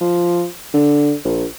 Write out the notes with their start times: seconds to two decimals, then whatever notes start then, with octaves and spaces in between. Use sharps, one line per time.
0.01 F3
0.74 D3
1.25 A#1